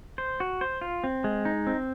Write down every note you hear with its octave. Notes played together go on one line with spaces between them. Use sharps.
C5
F#4
C5
F4
C4
G#3
D#4
C4